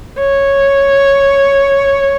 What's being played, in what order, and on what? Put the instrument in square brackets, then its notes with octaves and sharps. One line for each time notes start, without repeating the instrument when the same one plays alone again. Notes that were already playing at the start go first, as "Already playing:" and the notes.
[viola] C#5